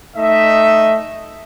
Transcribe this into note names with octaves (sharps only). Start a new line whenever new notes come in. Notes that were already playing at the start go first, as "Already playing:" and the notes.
A3 D#4 D#5 E5